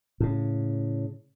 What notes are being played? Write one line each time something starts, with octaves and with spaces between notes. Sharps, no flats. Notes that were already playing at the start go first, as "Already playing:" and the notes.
A2 C#3